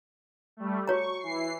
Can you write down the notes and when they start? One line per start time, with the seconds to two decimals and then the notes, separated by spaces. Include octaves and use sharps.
0.57 G3 A3
0.87 F#4 C#5 A#5 C#6
1.20 E3 C7